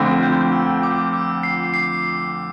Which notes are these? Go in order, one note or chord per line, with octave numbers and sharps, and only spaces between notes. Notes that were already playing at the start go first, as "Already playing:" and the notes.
Already playing: F2 D3 A3 C4
F6
G6
E6
D6
E6
C7
C7